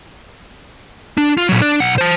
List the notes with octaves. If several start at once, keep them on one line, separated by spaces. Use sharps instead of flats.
D4
F4
A#2 F#3
D4 D5
B1 F#5
C5 A5